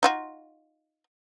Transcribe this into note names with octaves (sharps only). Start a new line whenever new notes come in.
D#4 F4 F#4